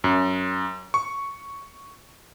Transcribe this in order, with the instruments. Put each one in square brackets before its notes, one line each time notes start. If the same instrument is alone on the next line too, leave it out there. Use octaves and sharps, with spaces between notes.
[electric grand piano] F#2
C#6